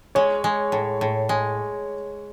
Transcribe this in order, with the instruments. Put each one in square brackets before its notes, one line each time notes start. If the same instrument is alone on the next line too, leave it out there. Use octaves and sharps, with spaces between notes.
[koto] G#3 [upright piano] C#5
[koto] G#3
A2
A2
G#3